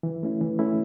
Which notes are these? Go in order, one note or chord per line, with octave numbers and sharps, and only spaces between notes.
E3
A3 C#4 E4
E3
A3 C#4 E4